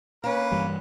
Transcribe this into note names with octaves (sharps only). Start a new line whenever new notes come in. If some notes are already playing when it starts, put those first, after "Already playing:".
A#3 C#4 B4
G2 E3 G3